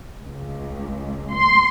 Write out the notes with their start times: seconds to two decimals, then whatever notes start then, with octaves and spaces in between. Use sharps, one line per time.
0.21 C#2
1.33 C6